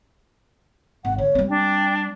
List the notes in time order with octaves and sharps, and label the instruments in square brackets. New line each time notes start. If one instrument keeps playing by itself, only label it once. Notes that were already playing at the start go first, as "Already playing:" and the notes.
[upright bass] G#1 [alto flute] F#5
[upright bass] D3 [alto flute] C#5
[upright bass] G3 C4
[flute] D4 [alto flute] G5